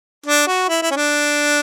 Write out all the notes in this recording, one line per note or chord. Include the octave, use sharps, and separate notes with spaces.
D4
F#4
E4
E4
C#4
D4